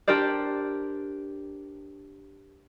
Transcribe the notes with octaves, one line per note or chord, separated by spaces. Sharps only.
D4 G4 A#4 C5 D5